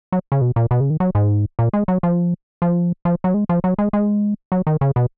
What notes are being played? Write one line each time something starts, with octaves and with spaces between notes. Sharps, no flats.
F#3
C#3
B2
A#2
B2
C#3
D#3
F#3
G#2
A#2
G#3
F#3
F3
F3
F3
F#3
G#3
F3
F#3
G#3
G#3
F#3
D#3
C#3
B2